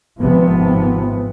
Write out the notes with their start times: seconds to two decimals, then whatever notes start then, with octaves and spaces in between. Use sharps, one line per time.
0.21 G#1 G#2 C3 F3 B3